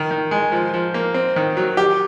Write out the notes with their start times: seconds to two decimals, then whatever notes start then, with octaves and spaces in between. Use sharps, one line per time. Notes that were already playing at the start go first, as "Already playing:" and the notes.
Already playing: D#3
0.11 D#3
0.31 G#3
0.52 F3
0.74 F3
0.94 A#3
1.14 C4
1.36 D#3
1.57 F#3
1.77 G4